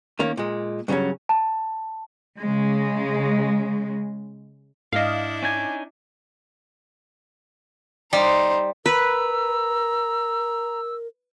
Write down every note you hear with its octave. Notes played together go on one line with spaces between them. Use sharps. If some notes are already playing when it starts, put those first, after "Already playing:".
D#3 A#3 C#4
A#2 G#3
G2 C#3 E3 F#3 C#4
A5
C#3 G#3
G#2 D4 E4 D#5 F5
C#4 D#4 G#5
G3 D#4 C5
A#4 B4 A#5 E6